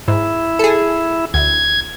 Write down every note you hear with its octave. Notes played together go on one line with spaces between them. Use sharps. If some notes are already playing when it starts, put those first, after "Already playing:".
G#2 E4
G#4 A4
D2 G#6